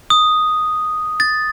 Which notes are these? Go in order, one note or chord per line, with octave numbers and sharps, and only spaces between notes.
D#6
A6